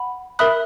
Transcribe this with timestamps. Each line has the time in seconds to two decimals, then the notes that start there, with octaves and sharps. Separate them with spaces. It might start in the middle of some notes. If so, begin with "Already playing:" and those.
Already playing: F#5 B5
0.39 A#4 E5 B5 D#6 F#6